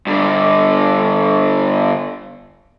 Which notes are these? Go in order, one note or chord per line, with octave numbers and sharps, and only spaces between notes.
G2 D3